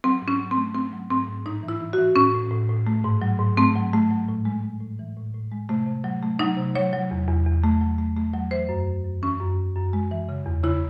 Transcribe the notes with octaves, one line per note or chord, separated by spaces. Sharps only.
F#3 C4
G#2
C#4
F#3
C4
A3
A3 C4
F#3
G#2 C4
G#2
A2 D#4
E3
E4
E3
F#4
E3
A2 C#4
A2
A2
A2
A3
G#2
F#3
G#2
A3 C4
F#3
A3
F#3
A2
G#3
G#3
A2
E3
A2
A2
G#3
C3 A3
C3
F#3
A3
F#3 D#4
C3
F#3 C#5
F#3
E2
E2
E2
A3
F#3
A3
A3
F#3
E3 C5
F#2
F#2
F#2
E3 C#4
F#2
F#2
F#2
G#3
E3
C#3
E2
C#3 E4